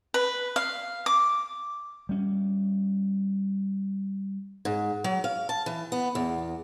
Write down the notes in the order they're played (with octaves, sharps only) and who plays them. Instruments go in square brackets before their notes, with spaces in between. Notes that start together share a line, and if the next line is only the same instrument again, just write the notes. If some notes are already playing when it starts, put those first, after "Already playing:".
[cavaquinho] B4
F5
D6
[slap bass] G3 C#4
[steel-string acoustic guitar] G#2
F#3
F5
A5
E3
B3
E2